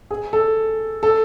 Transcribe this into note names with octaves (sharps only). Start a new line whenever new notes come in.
G#4
A4
A4